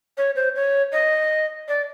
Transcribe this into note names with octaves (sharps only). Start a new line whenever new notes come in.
C#5
C5
C#5
D#5
D5